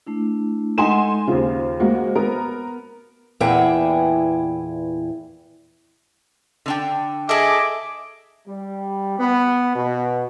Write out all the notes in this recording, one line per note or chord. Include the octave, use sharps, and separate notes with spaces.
A3 D4 E4
G#3 A3 D#4 A4 F#5 G#5 C6 E7
D#2 C#3 F4 C5
G#3 A#3 F#4
B3 A#4
E2 A#2 B3 E4 G#4 G5
D3 D4 G5
G#4 A4 D#5 E5 D6
G3
B3
B2